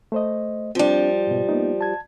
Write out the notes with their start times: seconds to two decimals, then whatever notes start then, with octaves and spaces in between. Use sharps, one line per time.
0.12 A3 C5 D#5
0.75 F3 G3 C4 D4
1.27 G#2 B2
1.49 A#3 B3 D#4
1.81 A5 G#6